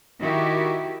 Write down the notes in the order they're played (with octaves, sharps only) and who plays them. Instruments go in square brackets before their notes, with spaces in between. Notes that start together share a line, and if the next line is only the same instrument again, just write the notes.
[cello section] D#3 E4 F#4 G4